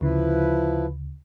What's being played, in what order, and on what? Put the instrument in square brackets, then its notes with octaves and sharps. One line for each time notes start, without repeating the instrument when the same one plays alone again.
[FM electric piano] D2 C#3 [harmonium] F3 E4 B4